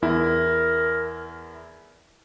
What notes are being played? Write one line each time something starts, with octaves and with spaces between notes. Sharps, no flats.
E2 E4 A#4